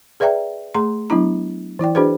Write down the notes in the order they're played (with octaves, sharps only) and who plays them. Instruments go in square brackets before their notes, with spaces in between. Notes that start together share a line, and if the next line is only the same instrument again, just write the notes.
[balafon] G#4 B4 D5 E5 G5 A#5
A3 G#4 A#5 C6
F#3 B3 D4 E4 A#5
E3 E4 D5 G5
D4 F#4 G#4 B4 C5